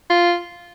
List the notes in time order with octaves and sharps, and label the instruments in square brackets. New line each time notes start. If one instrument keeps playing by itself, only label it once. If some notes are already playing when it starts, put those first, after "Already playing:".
[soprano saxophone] F4